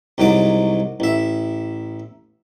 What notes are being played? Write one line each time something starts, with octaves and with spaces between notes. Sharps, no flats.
C2 G#2 F#3 F#4 D6
A1 E5